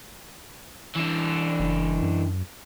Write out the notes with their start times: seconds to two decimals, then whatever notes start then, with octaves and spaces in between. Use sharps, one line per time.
0.95 E3 D4
1.60 F#1
2.02 F#2